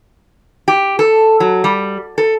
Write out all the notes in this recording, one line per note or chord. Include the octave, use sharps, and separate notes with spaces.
G4
A4
F#3
G3
A4